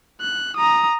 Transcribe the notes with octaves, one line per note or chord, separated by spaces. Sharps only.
F#6
A#5 D#6